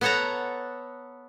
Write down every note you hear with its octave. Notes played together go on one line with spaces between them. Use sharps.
B3 A4 C#5 F#5 A5 A#5